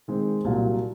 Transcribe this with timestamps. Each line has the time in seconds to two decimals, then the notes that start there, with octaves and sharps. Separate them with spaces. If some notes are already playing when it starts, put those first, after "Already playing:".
0.08 D#3 G#3 C4
0.44 C2 A#2 F#3